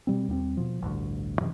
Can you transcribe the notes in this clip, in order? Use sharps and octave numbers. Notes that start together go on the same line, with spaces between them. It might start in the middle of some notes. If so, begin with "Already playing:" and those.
B2 G3 C4
D#2 G3 B3 C4
B2 F3
A1 D2 G2
F#2 C3 E3